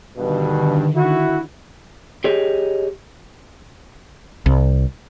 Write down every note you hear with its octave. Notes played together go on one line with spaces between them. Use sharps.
G2 B2 D3 D#3
E4 F#4
G4 G#4 C#5 D#5
C2